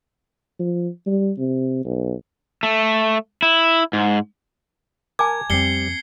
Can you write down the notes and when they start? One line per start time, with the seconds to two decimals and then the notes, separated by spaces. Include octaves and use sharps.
0.60 F3
1.07 G3
1.38 C3
1.85 B1
2.63 A3
3.42 E4
3.93 G#2
5.19 A#4 G#5 A5 D6 G#6
5.50 F2 G3 B3 C4 C7 C#7 G7